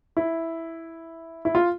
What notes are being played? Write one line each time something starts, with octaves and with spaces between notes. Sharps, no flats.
E4
E4
F4